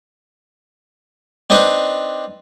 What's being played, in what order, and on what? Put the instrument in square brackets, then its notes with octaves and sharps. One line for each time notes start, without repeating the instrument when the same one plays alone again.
[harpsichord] C4 D4 D#4 B4 C5